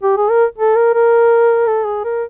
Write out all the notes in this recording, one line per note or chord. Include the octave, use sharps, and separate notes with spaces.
G4
G#4
A#4
A4
A#4
A#4
A4
G#4
A#4